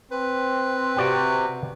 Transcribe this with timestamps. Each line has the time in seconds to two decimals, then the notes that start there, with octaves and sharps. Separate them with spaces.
0.11 C4 B4
0.97 C3 F#4 D5 G5